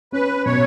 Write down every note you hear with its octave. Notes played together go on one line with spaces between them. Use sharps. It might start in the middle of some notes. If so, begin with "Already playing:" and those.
C#4 B4
B2 C#5